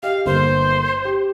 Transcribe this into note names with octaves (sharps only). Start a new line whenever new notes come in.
G4 D#5 F5
G1 A#3 C5
G4